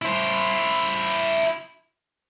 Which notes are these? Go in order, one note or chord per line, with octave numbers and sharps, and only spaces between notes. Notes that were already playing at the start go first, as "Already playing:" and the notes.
E4 C5